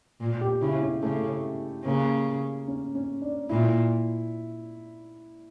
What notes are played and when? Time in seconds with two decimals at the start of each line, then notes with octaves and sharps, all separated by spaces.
0.20 A#2
0.41 G4
0.61 C#3 E4
0.82 C#4
1.02 C#3 A3
1.85 C#3 A#3
2.68 C#4
2.95 C#4
3.22 D4
3.49 A#2 E4